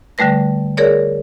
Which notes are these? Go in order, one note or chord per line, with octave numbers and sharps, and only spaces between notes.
D3 G3 A3 B4 A#6
G#4 A#4 C#5 D5